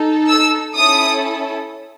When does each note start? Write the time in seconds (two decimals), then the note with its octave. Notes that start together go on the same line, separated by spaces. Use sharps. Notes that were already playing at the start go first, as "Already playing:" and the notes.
Already playing: D#4 A4
0.28 E6
0.76 C#4 E4 A4 D#6